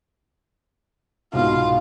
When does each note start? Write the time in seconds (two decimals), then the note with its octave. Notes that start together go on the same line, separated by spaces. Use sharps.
1.33 C2 G#2 B2 F4 F5